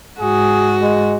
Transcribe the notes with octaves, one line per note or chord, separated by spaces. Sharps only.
G#2 F#4 G#4
G#3